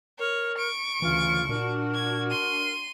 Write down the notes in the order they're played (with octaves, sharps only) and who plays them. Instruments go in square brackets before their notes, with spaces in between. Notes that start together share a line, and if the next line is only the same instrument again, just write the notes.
[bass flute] A#4 [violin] C#5
[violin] C#6 D7
[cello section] D2 C#3 [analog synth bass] E3 [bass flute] F4
[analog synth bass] A#2 [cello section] D4 F#4 [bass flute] A#4
[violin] G#6
C6 D#7